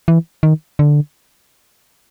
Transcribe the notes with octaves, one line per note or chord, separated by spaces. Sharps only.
E3
D#3
D3